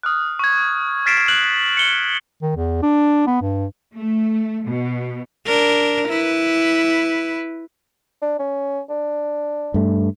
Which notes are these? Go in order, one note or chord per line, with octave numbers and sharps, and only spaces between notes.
D#6 F6 F#6
C#6 G#6
F6 A6 B6 C7 D7 E7
F#6 F#7
C#7 G7
D#3
E2
D4
B3
G2
A3
B2
D4 A#4
E4 B4
D4
C#4
D4
G2 A3